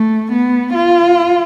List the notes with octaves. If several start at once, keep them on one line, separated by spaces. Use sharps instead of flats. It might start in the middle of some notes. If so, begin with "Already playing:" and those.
Already playing: A3
B3
F4